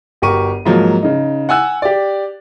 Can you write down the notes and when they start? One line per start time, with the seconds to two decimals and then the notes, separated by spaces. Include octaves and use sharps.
0.22 G1 F#4 G4 A#4 C#6 D#7
0.66 G#2 F3 F#3 A#3
1.03 C#3 D#4
1.49 F#5 G#5 E6 F#6
1.82 G4 D5